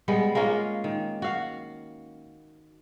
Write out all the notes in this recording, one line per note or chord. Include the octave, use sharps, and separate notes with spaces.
G3 G#3 B3
G#3 A#3 C#4 F4
D#3
F#4 F5